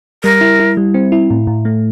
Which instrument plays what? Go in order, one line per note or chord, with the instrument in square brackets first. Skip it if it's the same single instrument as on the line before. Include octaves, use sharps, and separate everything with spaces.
[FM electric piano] G3 [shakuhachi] A#4
[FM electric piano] E4
E4
G3
C4
E4
A2
A2
A3